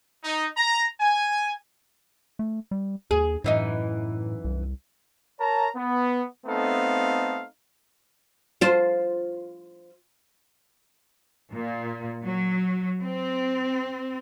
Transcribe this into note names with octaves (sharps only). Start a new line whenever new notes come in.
D#4
A#5
G#5
A3
G3
D#2 G#4
F#2 A2 E3 D#4
C2
A#4 C#5 A5 A#5
B3
A3 B3 C4 D#4 A4 F5
F4 C5
A#2
F#3
C4